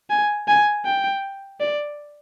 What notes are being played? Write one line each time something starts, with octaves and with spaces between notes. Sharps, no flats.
G#5
G#5
G5
D5